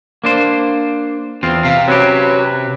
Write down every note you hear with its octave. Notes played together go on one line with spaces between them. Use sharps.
A#3 D4 C5
E2 C4 F4
C3 F5
F#3 C4 C#4 G4 B4